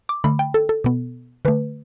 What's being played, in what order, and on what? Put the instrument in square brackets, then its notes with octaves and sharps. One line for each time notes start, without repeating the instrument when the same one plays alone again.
[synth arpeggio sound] D6
D3 A3 B5
G5
A4
A4
B2 B3
D3 A3 B4